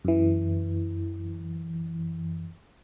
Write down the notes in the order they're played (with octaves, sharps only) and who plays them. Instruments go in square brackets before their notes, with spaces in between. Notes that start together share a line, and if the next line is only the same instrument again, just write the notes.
[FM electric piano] F#2 E3